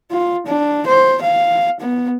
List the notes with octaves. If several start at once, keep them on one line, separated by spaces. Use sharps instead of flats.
F4
D4
C5
F5
B3